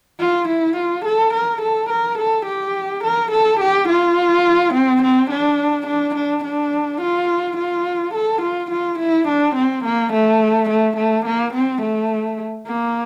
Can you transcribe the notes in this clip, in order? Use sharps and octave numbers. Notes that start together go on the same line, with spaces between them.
F4
E4
F4
A4
A#4
A4
A#4
A4
G4
A#4
A4
G4
F4
C4
C4
D4
D4
D4
D4
F4
F4
A4
F4
F4
E4
D4
C4
A#3
A3
A3
A3
A#3
C4
A3
A#3